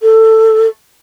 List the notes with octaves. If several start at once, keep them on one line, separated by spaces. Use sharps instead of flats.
A4